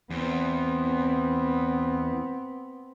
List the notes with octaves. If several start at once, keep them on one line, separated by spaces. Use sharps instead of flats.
E2 B3 C4